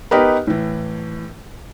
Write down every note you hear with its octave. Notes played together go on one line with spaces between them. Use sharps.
B3 D#4 G4 A#4 B4
A2 E3